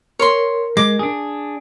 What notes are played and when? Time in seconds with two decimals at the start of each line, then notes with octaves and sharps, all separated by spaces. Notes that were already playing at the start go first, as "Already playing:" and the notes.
0.19 A#4 C#5 C6
0.77 G#3 D6
0.99 D4 G#4